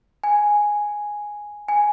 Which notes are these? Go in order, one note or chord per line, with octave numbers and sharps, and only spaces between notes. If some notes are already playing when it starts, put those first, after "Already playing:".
G#5
G#5